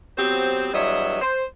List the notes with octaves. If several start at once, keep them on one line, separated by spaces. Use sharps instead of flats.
F#3 B3 C4 G4 C5
E2 G2 F#3 D#5 E5
C5